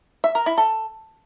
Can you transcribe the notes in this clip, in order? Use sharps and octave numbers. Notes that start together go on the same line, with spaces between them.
E5
A#4
E4
A4